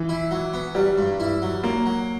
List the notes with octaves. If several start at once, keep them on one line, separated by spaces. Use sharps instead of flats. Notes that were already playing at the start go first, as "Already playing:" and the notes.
Already playing: E3
E4
F#3
B3
F#3 G3
G2
E4
F#3
F#3 A#3
F#3